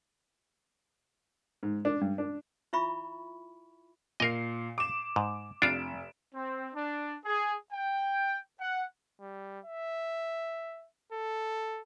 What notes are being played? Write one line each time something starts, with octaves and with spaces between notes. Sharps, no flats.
G#2
D4
G2
D4
E4 F4 E5 B5 C#6
A#2 A#4 D#5 C7
D6 E7
G#2
F1 D4 F4 D7 E7
C4
D4
G#4
G5
F#5
G3
E5
A4